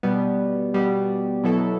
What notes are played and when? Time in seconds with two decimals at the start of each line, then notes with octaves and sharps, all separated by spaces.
0.03 B2 G3 B3
0.74 B2 G3 B3
1.44 B2 F#3 B3 E4 A4